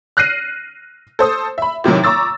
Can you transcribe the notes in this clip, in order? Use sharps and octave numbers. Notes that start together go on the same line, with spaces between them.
F6 F#6 A#6 C7 D#7
A4 C5 D#6
E5 B5
A2 C3 D#3 F#3
A#5 C#6 D6 E6 A6